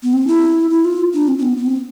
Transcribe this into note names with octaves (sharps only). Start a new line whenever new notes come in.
B3
C4
E4
E4
F4
D4
C4
C4
B3
B3
C4